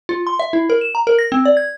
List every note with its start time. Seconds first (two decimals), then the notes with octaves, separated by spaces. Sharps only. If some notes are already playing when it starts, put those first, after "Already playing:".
0.09 F4
0.27 C6
0.39 E5
0.53 E4
0.70 A#4
0.81 E7
0.95 A#5
1.07 A#4
1.19 A#6
1.32 C4
1.45 D5
1.57 G#6